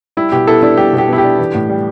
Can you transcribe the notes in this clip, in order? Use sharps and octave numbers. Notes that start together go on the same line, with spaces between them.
G3 E4
B2 G4
B3 E4 A4
D4 E4
G3 G4
B2
G4
B3 E4
G4
D4
E3
A2
G3